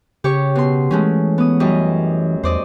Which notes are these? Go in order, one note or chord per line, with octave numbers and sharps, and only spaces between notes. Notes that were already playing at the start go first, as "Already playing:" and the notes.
C#3 G4 C#5 C#6
B2 C6
E3 G#3 A3 C#4
B3 D#6
F#2 G3 D#5
E2 C5 D5 D#5